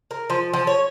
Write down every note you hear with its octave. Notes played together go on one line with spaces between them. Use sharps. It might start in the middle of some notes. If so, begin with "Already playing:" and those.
A#4
F3
F3
C#5